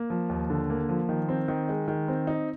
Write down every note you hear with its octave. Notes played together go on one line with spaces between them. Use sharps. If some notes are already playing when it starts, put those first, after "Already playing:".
Already playing: A#3
F3
D#2
D3
A#3
F3
D#3
C4
D#3
G#3
D#3
C4
D#4